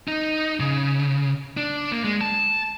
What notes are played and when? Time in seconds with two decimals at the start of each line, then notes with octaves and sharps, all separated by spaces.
0.08 D#4
0.60 C#3
1.57 D4
1.92 A#3
2.04 G#3
2.21 A5